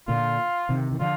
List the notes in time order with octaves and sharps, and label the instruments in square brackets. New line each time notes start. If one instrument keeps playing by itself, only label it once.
[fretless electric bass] A#2 D3 [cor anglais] F4
[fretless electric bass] C3 D#3
D#3
[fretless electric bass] D3 F3 [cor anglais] F4